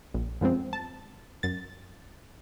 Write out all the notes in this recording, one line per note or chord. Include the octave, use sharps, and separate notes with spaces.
A#1
F#2 F3 G#3 C4
A5
F#2 A6